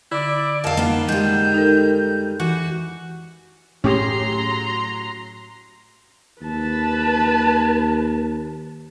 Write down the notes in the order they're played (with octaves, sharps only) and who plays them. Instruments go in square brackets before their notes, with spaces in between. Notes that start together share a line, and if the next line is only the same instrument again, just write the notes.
[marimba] D3 [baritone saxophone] E4 [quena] D5
[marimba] F2 [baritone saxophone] A#2 [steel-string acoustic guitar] D#5 F5 [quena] A5
[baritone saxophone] D#3 [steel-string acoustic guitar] A#3 B3
[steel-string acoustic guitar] G3 G#3 [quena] G6
[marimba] D#4 A4 A#4
[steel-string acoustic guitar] E3 [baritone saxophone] F#4
[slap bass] A2 A3 [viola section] F#3 A#5 C6 [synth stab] C#4 G4 G#4
[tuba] D#2 [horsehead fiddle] B4 A5